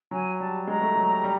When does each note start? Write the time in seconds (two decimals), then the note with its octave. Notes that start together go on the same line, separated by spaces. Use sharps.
0.11 F#3 G#5
0.40 G3 A5
0.67 G#3 A#5
0.82 A3
0.95 F#3
1.10 G3
1.24 G3